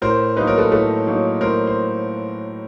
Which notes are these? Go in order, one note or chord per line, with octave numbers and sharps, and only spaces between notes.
A2 A#4 C5
F#3 A#3 D#4 B4
A#4
A4 B4
A2 A4 B4
F#3 A#3 D#4
A2 A#4 C5
C5